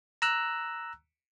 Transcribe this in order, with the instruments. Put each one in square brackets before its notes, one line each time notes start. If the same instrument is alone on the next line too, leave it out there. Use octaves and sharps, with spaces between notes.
[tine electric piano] A#5 E6 F#6